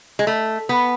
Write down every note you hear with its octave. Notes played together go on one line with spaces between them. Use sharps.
G#3
A3
B3